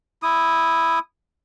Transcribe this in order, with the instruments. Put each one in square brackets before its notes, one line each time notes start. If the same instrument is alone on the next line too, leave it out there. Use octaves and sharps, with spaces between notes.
[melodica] E4 D#6